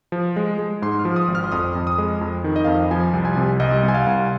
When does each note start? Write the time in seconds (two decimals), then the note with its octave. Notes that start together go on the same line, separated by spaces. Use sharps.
0.12 F3
0.36 G#3
0.59 G#3
0.82 G#2 C6
0.99 F6
1.05 F3
1.16 D#6
1.28 G#1
1.35 F6
1.44 C6
1.52 F2 D#6
1.75 F2
1.87 D#6
1.98 G#3
2.21 F2
2.44 D#3
2.56 D#5
2.64 F2 F5
2.74 D#5
2.91 F3 G#5
3.13 C2
3.25 G#5
3.37 C3
3.60 C2 D#5
3.83 C2
3.88 G#5
3.94 F5
4.07 C2